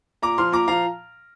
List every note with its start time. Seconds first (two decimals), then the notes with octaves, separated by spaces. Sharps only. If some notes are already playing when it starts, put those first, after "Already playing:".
0.22 A#2 A#5 D6
0.38 F3 C6 F6
0.52 A#2 A#5 D6
0.68 F3 F5 A#5